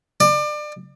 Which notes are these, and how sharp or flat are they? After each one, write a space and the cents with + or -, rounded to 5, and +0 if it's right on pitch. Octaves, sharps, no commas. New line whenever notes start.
D5 +30